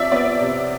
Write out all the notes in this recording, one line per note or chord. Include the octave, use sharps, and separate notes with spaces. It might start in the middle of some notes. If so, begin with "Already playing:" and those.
Already playing: C3 F3 D5 E5
B3 D5
C3